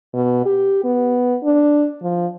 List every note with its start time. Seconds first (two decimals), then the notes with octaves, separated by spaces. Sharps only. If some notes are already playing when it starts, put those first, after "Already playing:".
0.14 B2
0.46 G4
0.84 B3
1.44 D4
2.02 F3